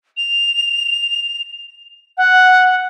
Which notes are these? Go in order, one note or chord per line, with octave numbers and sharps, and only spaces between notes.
F7
F#5